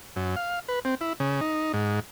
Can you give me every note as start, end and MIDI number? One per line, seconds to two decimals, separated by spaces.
0.16 0.35 42
0.36 0.59 77
0.69 0.79 71
0.85 0.95 60
1.01 1.13 64
1.20 1.41 49
1.41 1.72 63
1.73 2.00 44